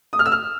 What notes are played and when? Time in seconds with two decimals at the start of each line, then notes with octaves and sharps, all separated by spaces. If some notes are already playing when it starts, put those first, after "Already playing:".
0.13 D#6
0.19 F6
0.26 E6
0.32 F6